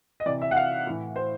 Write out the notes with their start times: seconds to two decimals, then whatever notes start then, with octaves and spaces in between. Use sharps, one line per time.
0.20 D#5
0.26 C3 E3 D5
0.42 E5
0.51 F#5
0.56 F5
0.87 A2 E3
1.16 C5